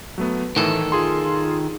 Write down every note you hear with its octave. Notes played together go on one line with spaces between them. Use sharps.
F#3 A3 B3
A2 D#3 E3 A4
F4 G#4 C6